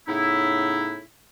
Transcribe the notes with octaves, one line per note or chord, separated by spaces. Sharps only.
A2 C#3 B3 D#4 E4